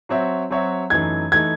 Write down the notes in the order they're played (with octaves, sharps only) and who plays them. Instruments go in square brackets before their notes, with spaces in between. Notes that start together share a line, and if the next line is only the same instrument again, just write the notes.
[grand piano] F#3 C4 F#4 C#5 E5
F#3 C4 F#4 C#5 E5
[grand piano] F#2 E3 A3 D#4 [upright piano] G#6
[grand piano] E3 A3 D#4 [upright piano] G#6